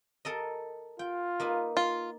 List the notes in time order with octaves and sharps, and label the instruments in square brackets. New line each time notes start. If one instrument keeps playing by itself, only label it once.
[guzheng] A4 A#4 D#5
[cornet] F4 [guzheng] G5
[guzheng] A#3 D#4 B4
[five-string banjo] F4